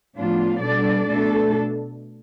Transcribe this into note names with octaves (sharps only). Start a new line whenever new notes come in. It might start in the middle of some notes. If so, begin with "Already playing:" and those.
A2 F3 B3 D4 F4
B2 G3 D4 A4 D5
B2 A3 D4 A4